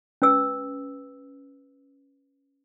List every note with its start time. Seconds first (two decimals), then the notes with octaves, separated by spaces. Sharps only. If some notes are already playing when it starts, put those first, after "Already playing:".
0.22 C#4 B4 E6